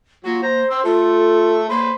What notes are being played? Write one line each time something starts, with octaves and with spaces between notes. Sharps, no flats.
F#3 A#3 F4 F#4
C5 A#5
C5 C6 E6
A3 F4 A4
A#3 B4 C5